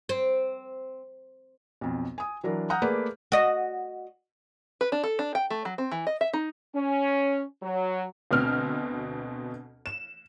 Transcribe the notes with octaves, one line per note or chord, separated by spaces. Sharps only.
C4
B1 F2
G#5 D#6
E3 F#3 D4 A#4
F#5 A#5 D#6 F6 G6
A3 A#3 G#4 B4 D5
F#4 D#5
B4
D4
A4
D4
G5
A3
F#3
C4
E3
D#5
E5
D#4
C#4
F#3
D2 B2 C4 F6
E7